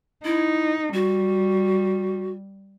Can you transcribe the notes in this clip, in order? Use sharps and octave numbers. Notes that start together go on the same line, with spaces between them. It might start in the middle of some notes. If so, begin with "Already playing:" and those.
D#4 E4
G3 F#4